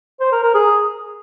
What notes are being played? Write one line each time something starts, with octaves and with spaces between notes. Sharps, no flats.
C5
A#4
A#4
G#4